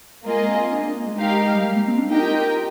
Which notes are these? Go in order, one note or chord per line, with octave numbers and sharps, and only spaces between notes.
G#3 A#3 F4 G#4 D#5
C4
D4
A#3
G#3
D#4 G4 A#4 F5
G3
G#3
A#3
C4
D4
D#4 G4 A#4 D#5 G5
F4
F4
F4